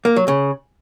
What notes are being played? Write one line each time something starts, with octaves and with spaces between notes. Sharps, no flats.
A#3
F#3
C#3